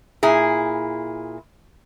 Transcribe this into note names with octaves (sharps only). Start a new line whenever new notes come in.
A#2 E4 G#4